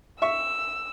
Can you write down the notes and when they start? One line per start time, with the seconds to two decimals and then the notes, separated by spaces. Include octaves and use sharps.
0.22 E5 C#6 E6